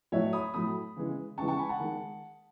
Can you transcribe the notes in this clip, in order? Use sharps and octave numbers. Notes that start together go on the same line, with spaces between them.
A2 F#3 A3 C#5 E5
B5 D#6
A2 F#3 A3 B5 D#6
C#3 E3 G#3
C#3 E3 G#3 A5 C#6
A5 C#6
G#5 B5
F#5 A5
D#3 G#3